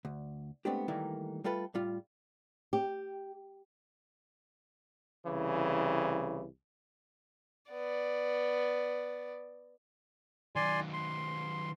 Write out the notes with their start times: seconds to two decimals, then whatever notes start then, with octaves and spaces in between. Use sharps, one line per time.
0.05 D2
0.65 G#3 A3 B3 C4 D4 G4
0.88 D#3 E3 G3 A3 A#3 D#4
1.44 G3 A3 F4 A4 B4
1.74 A2 G3 F4
2.73 G4
5.27 C2 C#3 E3
7.72 B3 D5
10.56 D#3 F#3 D5 G#5 C6
10.93 C6